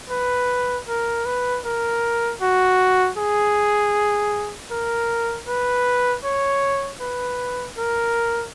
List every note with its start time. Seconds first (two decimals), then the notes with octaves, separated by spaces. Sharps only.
0.10 B4
0.88 A#4
1.26 B4
1.65 A#4
2.42 F#4
3.18 G#4
4.71 A#4
5.48 B4
6.24 C#5
7.01 B4
7.78 A#4